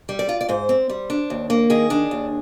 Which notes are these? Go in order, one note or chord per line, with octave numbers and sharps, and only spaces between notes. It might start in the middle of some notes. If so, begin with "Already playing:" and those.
G3
D5
F4
D5
G#2 C5
C4
G3
D4
D#2
A#3
D#3 G#4
D4
D#2